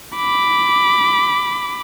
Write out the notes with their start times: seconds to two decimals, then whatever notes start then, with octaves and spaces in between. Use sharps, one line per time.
0.16 B5 D6